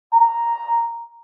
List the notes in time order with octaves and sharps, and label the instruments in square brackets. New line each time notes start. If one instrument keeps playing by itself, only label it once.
[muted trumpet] A#5